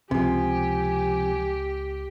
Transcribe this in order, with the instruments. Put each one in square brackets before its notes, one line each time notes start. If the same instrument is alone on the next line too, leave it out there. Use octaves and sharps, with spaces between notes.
[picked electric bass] C#2 [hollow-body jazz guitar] C3 F3 [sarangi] G4 [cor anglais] G#5